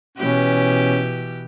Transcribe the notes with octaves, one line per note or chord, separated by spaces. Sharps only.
B2 E3 C#4 G4